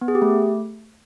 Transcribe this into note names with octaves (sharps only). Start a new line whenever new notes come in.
B3
G#4
G4
A3